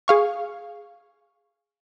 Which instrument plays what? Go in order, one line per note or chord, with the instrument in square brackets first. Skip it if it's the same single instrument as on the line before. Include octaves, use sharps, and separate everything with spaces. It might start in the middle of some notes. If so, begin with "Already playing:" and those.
[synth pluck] G#4 F5 C#6